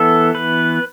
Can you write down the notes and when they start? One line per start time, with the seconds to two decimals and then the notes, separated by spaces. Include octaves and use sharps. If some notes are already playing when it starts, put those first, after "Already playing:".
Already playing: E3 B3 A4
0.35 B4